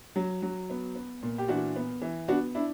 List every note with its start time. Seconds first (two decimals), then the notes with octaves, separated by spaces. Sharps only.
0.16 F#3
0.42 F#3
0.70 B3
0.95 B3
1.22 A#2
1.38 G4
1.48 E3 D4 F#4
1.76 B3
2.02 E3
2.28 B3 D4 F#4
2.55 D4 E4